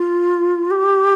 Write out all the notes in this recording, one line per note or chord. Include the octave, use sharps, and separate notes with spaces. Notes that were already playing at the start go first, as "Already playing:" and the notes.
Already playing: F4
G4